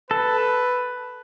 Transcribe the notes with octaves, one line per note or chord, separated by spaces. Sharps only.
A4 B4